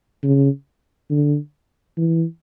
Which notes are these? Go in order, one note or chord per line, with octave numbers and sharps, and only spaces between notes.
C#3
D3
E3